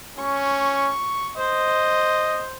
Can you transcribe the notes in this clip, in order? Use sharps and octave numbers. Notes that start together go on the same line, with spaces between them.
C#4 C#6
C5 D#5